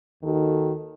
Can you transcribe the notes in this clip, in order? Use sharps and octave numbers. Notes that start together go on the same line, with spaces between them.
D#2 D#3 F#4 A4